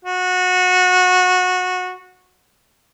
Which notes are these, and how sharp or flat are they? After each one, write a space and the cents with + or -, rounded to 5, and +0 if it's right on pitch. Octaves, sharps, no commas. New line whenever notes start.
F#4 -20